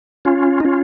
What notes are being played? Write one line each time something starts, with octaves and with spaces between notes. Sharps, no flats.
C#4 F4
D#4
C#4 F4